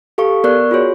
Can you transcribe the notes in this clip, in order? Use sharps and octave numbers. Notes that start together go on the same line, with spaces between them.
G4 A4 F5 C#6
B3 A#4 D5 C#6 F#6
F4 F#4 G#4 C#5